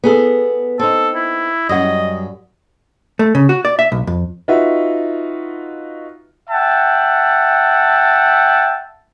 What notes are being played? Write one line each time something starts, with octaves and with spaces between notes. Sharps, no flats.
B3 G#4 A4
C4 D#4 A4
E4
F#2 G3 D#5 F#5
A3
C#3
F#4
D5
E5
B1
F2
D#4 F4 F#4 B4 E5
E5 F#5 G5 A5